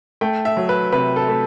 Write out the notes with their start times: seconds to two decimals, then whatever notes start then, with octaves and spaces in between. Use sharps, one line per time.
0.21 A3 G5
0.45 E5
0.57 F#3
0.69 B4
0.92 C3 B4
1.16 A4
1.28 A3